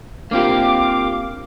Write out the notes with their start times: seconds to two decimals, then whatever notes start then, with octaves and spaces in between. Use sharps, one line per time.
0.31 A#3 C4 D4 F4 G4 F5 D6